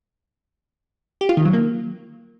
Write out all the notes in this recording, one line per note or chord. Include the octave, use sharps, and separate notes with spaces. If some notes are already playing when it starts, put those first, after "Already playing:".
G4
F4
D#3
F#3
A#3